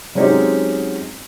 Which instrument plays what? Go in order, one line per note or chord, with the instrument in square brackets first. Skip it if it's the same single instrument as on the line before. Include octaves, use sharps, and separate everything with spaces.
[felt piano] F#3 G#3 C4 C#4 D#4 G4